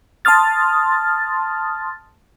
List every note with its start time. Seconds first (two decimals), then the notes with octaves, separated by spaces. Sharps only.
0.25 A5 C6 D#6 F6 A6